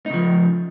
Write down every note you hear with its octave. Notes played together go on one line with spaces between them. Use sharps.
C#3 F3 D#4